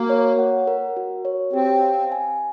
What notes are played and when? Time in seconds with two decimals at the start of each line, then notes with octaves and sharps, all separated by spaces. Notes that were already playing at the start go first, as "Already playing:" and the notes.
Already playing: A#3 F#4
0.10 C#5
0.39 F#5
0.67 A#4
0.97 F#4
1.25 C#5
1.53 C4 G4
1.83 F5
2.12 G#5